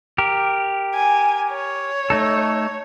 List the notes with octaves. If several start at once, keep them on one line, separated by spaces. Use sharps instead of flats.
G4 A#4
G#5
C#5
A3 D#4 A4